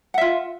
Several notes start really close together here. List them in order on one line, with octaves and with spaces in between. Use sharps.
F#5 E5 F4